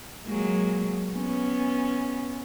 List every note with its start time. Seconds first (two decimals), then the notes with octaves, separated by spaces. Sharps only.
0.25 F#3 G#3 A#3
1.13 B3 C#4